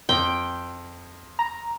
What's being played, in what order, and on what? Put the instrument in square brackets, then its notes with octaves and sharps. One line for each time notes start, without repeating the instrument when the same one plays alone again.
[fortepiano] F2 [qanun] G5
[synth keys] A#5